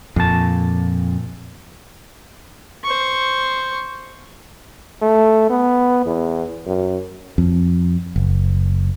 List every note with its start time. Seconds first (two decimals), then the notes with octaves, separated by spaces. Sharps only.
0.16 F2 A#2 A5
2.84 C5 C#6
5.02 A3
5.50 B3
6.06 E2
6.66 F#2
7.38 F2
8.16 F#1